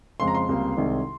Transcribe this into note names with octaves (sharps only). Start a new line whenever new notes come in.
F2 C#3 G#3 C4 C6
A#5
C6
C#2 C3 G3 A#3
C2 C3 D#3 G#3 C4